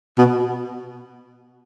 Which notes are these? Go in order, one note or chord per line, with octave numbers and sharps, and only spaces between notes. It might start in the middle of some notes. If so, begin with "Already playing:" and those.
B2